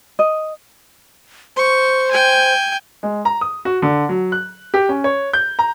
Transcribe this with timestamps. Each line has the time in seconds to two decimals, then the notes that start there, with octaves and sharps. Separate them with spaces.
0.19 D#5
1.57 C5 C#6
2.12 G5 G#5
3.03 G#3
3.25 A#5
3.41 D#6
3.65 F#4
3.82 D3
4.09 F#3
4.32 F#6
4.74 G4
4.89 C#4
5.04 C#5
5.33 G6
5.59 A#5